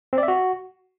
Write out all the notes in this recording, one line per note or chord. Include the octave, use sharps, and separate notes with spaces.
C4
D5
E5
F#4